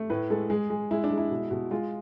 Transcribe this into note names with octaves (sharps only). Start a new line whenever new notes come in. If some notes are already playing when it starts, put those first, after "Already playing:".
Already playing: A3
A2 B4
G#3 A4
G#3 G#4
G#3
G#3 E4
D4
G#3
E4
B2
B2
G#3 F4